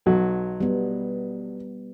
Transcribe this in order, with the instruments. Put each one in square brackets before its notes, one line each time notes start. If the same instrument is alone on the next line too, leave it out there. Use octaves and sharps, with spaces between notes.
[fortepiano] B1 F#3
[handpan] G3 B3